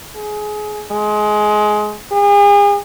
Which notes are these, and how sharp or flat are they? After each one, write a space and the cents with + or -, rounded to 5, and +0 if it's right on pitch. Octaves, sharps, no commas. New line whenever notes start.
G#4 +20
G#3 +20
G#4 -40